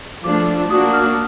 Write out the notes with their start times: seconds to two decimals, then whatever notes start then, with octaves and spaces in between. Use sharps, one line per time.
0.23 F3 A3 D4 D6
0.70 A#3 D4 F#4 D#6
0.93 F6